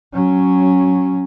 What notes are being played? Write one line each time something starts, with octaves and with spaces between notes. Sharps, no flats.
F#3 C#4